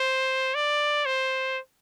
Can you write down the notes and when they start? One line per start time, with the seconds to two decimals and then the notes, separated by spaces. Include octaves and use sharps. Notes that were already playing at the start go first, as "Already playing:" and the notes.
Already playing: C5
0.55 D5
1.06 C5